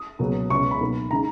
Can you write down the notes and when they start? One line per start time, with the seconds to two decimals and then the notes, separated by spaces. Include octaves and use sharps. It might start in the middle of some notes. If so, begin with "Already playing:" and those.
Already playing: D#6
0.19 C#2 B2 F#3 A#3 C#4
0.50 C#2 B2 G#3 C#4 C#6
0.71 B5
0.81 B1 B2 A#3
1.11 D#3 G#3 A#5